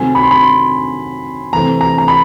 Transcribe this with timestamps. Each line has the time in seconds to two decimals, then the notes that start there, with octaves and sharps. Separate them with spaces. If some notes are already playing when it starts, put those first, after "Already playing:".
Already playing: C3 D#3 F#3 A3 C4 G#5
0.15 B5
0.23 C6
0.31 B5
0.42 C6
1.53 C3 E3 A3 C4 A#5
1.81 A#5
1.98 A#5
2.08 B5